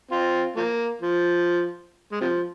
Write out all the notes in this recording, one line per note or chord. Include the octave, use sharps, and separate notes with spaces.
C4 F4
F3 A#3
F3
G#3
C3 F3